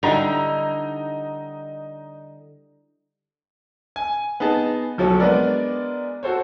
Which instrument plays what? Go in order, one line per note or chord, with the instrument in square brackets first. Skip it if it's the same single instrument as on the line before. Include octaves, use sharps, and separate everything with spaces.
[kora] D3 G3 E4 [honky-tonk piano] D#4 A#5 F7
[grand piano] G#5
B3 D#4 G#4 A5
B1 F3 F#3 C#4 A4
G#3 B3 D4 A#4 D5
F#4 A4 C5 C#5